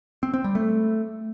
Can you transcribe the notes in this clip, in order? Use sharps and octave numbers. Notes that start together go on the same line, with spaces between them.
C4
C4
G3
A3